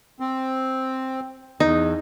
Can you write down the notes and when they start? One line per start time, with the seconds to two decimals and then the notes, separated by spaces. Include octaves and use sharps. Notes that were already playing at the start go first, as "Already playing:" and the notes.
0.20 C4
1.60 E2 D#4